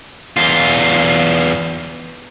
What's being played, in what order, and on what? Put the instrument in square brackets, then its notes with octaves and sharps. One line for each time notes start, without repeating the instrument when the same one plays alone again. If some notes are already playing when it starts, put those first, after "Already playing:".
[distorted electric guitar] E2 F4